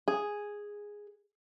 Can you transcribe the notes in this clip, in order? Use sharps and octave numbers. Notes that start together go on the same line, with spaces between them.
G#4